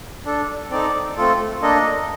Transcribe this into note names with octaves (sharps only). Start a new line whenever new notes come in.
D4 A4
C4 D#4 A4 D5
A3 C4 F4 A4
A#3 D4 A4 D#5